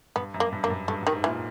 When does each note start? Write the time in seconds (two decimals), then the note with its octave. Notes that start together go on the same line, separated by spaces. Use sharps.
0.16 G2 B3
0.34 F#2
0.40 A#3
0.52 G2
0.63 F#2 A#3
0.70 G2
0.88 G2 A3
1.02 G2 D#3
1.13 G#2
1.24 A#2 E3